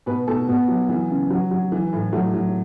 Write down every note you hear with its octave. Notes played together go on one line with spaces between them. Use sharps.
B2 B4
B2 A4
B2 B3
F#3
E3
C#3
F#3
F#3
E3
A2
F#3 A3
F#3